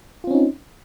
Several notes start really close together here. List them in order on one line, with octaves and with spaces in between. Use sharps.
F4 C4 C#4 D#4